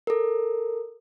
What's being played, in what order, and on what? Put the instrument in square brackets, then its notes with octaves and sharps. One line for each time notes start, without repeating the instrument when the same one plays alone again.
[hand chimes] A4 A#4